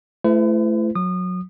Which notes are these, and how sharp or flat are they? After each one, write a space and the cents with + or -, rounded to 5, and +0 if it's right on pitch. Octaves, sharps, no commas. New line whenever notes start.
A3 -10 E4 +35 B4 +45
F#3 -20 D#6 -30